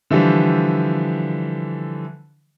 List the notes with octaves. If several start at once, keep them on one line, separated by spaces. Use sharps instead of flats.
D3 E3 F3 G3